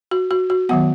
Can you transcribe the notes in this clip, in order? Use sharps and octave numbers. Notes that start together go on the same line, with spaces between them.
F#4
F#4
F#4
D#3 F#3 B3 F#5